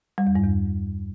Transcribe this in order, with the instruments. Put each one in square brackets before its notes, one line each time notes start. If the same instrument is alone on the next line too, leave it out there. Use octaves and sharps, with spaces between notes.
[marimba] G3
E2
G2
E2